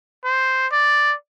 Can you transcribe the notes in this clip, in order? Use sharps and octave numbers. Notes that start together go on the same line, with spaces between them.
C5
D5